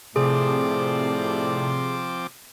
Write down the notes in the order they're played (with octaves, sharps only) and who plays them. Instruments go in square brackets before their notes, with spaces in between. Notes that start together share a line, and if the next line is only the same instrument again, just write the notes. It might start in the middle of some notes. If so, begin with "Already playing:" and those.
[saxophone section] A2 D5 [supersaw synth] C3 [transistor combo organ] F3 C4 D6 [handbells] G#4